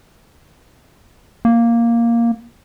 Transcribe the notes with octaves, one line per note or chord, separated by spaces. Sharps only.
A#3